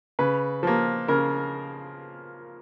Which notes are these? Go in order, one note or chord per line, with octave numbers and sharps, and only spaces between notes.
C#3 B4
F3 A#3
C#3 A#4